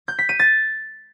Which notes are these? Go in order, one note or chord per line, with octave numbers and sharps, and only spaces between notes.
G6
B6
D#7
A6